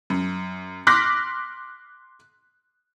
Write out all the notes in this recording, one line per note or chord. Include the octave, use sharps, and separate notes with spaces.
F#2
C6 D6 F6 F#6 A#6 B6